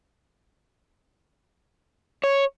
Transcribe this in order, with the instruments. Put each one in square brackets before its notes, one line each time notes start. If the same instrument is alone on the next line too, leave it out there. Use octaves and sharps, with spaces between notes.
[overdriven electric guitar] C#5